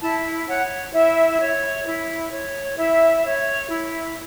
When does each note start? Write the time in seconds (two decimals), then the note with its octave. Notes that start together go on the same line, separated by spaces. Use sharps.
0.01 E4 A5
0.48 C#5 F#5
0.94 E4 E5
1.40 C#5
1.86 E4
2.32 C#5
2.78 E4 E5
3.24 C#5
3.69 E4